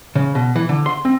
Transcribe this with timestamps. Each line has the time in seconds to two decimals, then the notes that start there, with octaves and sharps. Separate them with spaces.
0.16 C#3
0.35 B2
0.56 E3
0.69 D3
0.86 C6
1.05 C4